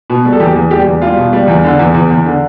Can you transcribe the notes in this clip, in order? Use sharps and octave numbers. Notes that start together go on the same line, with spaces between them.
B2
G3
A4
E2 G4
E2
G3 G4
E2
G3 F4
B2
G3
E2
D3
E2
E2
E2
D3